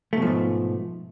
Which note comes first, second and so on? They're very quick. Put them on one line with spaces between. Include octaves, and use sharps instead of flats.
A3 B2 F3 G#2